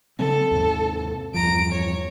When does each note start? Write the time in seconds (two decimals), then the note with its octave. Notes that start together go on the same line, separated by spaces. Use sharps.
0.19 C#3 F#3 C4 A4
0.51 D#2 G#2 C3
1.34 E2 G2 F3 A#5 D7
1.72 C#5